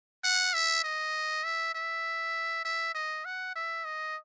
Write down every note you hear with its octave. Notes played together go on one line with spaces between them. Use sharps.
F#5
E5
D#5
E5
E5
E5
D#5
F#5
E5
D#5